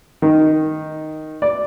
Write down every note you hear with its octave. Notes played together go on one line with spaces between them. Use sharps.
D#3
D5